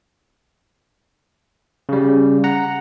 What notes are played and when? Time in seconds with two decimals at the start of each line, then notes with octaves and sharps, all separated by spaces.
1.89 C#3 G3
2.44 F#5 A#5